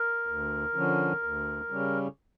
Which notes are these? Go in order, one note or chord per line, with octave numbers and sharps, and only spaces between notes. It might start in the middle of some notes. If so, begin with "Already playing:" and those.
Already playing: A#4
D2
D3 F3 C#4
D2
C#3 G3 C#4